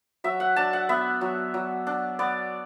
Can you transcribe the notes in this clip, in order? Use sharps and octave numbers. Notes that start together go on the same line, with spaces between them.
F#3 E5
F#5
D4 A5
F#5
B3 E5
F#3
F#3
D4
B3 D5